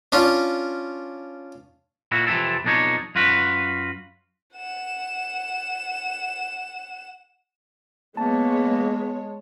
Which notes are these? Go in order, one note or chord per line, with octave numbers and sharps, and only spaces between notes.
C#4 D4 F4
A#2 E4 F#4
F2 C3 E3 E4 A4
B1 F2 D4 D#4 C#5
F#2 F4 F#4 B4
F#5 E7
G#3 A#3 B3 C#5 A5